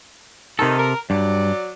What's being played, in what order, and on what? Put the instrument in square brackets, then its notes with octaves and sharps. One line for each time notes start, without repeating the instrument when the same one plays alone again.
[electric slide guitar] C3 A4 [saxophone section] D#3
[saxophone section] A#4
[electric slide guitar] G2 [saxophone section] F#3 D5